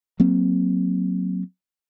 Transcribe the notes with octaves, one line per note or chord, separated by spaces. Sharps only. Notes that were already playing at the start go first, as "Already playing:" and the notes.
F#3 A#3 C4